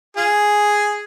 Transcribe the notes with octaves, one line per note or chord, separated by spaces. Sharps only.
F4 G#4